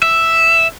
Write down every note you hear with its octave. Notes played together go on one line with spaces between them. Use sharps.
E5